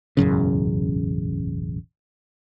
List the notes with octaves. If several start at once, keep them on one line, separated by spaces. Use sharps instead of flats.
E1 A1 F#2 C#3